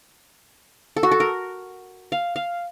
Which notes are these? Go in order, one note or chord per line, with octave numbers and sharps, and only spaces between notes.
A4
F#4
A4
A#4
F5
F5